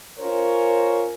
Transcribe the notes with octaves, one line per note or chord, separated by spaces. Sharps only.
C#4 F4 A#4 C5 C#5